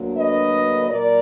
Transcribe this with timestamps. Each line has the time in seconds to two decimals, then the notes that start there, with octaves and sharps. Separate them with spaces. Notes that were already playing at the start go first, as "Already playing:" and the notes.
Already playing: D2 D3 F#3 A#3 D4
0.17 B4 D#5
0.89 A#2 F#3 A#4 D5